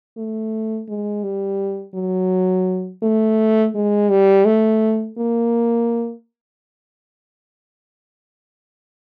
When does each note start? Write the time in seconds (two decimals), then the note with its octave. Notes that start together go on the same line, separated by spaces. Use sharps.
0.17 A3
0.88 G#3
1.24 G3
1.95 F#3
3.03 A3
3.75 G#3
4.10 G3
4.45 A3
5.18 A#3